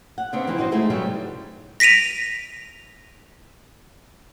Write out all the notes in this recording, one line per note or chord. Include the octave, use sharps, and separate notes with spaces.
F#5
C#3 B3 C4 D4
E3 F3 C4 D#4
D#4 F#4 C5
G#3 A3 D#4 E4 G4 G#4
G2 C#3 F#3 G3 B3
A#6 B6 D7 D#7 F7